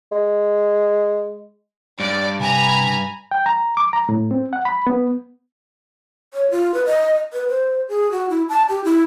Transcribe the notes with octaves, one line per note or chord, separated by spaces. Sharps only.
G#3
G2 D5
C3 G#5 A#5 B5
G5
A#5
D6
A#5
A2
C4
F#5
B5
B3
C#5
F4
B4
D#5
B4
C5
G#4
F#4
E4
A5
G4
E4